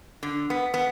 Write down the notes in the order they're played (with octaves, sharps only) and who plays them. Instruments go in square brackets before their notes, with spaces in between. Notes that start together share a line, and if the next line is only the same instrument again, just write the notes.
[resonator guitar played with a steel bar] D3
B3
B3